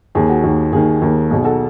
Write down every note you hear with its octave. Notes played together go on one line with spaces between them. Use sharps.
D#2 D#3 G#4
F#4
D#2 D#3
D#2 D#3 G#4
D#2 D#3
B1 B2 G#4
F#4 A4